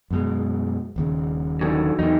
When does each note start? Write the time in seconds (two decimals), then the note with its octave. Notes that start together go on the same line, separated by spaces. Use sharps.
0.11 F#2 B2 G#3
0.96 D#1 D#2 C#3
1.61 D3 D#3 F#3
1.99 E2 C3 F#3 D#4